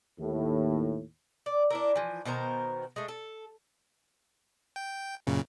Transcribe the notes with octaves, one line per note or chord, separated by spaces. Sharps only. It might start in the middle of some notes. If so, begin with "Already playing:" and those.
D#2 A2
D5
D4 E4 A#4
E3 F3
B2 D#3 C5 A#5
G#3 A3
A4
G5
F#2 A#2 C#3